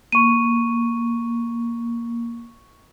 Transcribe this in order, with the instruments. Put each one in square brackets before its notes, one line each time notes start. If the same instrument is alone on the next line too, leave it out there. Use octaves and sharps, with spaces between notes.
[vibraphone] A#3 [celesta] C#6 D#7